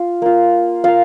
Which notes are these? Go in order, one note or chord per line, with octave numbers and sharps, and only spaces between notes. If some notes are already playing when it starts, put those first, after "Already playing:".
Already playing: F4
A#3 F4
A#3 F4 F5